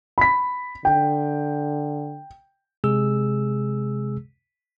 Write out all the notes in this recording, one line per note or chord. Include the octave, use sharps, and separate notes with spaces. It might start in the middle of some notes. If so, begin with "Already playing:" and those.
B5 B6
D3 G5
C3 G#3 G#4 E6